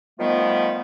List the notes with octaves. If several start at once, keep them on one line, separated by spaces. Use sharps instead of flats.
B2 D#3 F3 G3 A3 B3